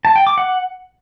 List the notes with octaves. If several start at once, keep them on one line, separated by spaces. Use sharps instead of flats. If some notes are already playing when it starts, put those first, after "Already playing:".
A5
G5
D6
F#5